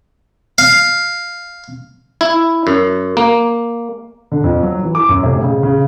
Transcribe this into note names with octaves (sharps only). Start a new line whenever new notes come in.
F5
E4
F#2
A#3
D3
F2
F#3
E3
D6
F#2
F1
C#3
C#3